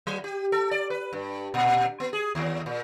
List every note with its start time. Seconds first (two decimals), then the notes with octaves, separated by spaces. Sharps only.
0.07 F#3
0.24 G4
0.52 A4
0.71 D5
0.90 B4
1.13 G2
1.54 A#2
2.00 B3
2.13 G#4
2.35 D#2
2.66 A#2